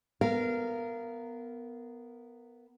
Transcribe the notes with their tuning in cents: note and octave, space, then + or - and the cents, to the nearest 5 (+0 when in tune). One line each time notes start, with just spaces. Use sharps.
B3 +0 A#4 -10 F5 -30